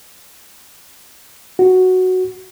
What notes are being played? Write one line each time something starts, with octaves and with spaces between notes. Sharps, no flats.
F#4